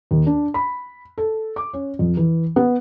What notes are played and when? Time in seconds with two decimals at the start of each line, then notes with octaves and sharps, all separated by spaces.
0.11 D#2
0.26 D4
0.54 B5
1.18 A4
1.56 D6
1.73 C#4
1.99 F2
2.17 E3
2.56 B3